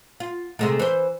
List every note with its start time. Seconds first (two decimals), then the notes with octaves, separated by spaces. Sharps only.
0.20 F4
0.59 C3 G#3 A3
0.79 E3 C5